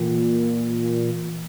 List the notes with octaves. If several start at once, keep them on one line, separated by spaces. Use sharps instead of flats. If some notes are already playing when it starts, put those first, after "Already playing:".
Already playing: A#2 E3